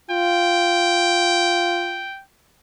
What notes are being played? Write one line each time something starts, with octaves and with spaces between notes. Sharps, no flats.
F4 G5